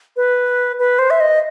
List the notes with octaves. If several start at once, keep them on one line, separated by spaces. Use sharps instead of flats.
B4
B4
C5
E5
D#5